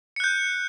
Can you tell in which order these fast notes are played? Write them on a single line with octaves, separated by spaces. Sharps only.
C#7 F#6 G6